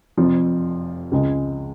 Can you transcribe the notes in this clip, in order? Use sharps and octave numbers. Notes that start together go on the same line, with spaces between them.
F1 F2 F3
C#2 C#3 G#3